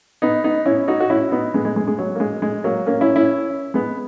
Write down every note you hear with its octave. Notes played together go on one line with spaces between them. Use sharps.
B3 D#4
B3 D#4
C#4 E4
D#4 F#4
F#4
C#4 E4
B3 D#4
G#3 B3
G#3
G#3
G#3
F#3
A#3
G#3
G#3
F#3 A#3
A#3 C#4
C#4 E4
C#4 E4
G#3 B3